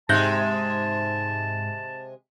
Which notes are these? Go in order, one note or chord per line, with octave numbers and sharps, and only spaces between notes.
G#2 C3 G#3 A5 F#6 G6 A#6